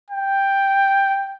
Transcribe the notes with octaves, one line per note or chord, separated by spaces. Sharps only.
G5